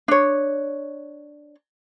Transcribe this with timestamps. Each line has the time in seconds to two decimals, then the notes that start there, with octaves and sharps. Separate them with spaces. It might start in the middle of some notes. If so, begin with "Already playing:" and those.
0.08 D4 C#5